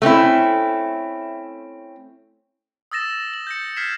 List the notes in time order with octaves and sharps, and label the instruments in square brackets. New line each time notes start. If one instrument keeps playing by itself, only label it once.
[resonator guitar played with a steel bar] A3 C4 C#4 E4
[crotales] D#6 E6 A6 A#6 E7
F#7
G6 A#6 C#7
F6 G#6 B6 C7 E7